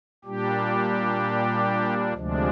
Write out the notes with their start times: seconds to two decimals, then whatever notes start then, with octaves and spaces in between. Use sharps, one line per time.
0.25 A#2 G3 D4 G4
2.13 D2 C3 F3 G#3 D4